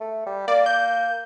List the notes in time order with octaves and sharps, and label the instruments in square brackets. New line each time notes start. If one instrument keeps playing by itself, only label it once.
[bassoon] A3
G3
[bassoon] A#3 [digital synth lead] D5
[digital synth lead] G6